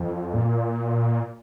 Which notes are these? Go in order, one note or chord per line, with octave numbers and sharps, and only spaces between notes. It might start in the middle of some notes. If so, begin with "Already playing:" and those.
Already playing: F2
A#2